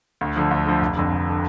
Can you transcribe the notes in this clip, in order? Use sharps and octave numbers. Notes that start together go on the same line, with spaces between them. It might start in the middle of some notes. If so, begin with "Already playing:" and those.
D2
D3 F3
D2
D3 F3
F1
F2 D3
F1
D3